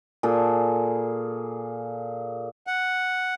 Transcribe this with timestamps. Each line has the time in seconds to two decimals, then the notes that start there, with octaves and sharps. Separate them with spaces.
0.23 A#2 G#4 A4
2.67 F#5